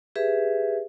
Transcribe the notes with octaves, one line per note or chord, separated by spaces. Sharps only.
G4 G#4 B4 E5